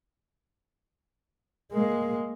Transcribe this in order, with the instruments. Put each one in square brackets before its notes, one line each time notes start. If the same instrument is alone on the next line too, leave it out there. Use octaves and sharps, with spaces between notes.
[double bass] G#3 A#3